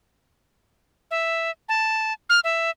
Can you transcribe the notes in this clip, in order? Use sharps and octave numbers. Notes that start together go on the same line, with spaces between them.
E5
A5
F6
E5